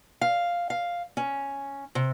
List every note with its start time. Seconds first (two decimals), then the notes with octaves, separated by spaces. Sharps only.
0.21 F5
0.70 F5
1.17 C#4
1.95 C3